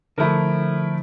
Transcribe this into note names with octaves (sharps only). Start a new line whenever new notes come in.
D3 F3 A3 E4 A#4